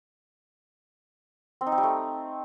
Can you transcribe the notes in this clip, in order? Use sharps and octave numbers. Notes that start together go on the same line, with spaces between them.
C4
D#4
C4
G3
A3